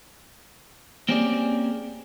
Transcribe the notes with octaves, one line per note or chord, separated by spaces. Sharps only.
A#3 C4 C#4 G4 G#4 D5